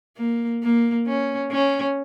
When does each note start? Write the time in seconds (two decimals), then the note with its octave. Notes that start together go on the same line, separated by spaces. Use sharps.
0.17 A#3
0.63 A#3
1.07 C#4
1.51 C#4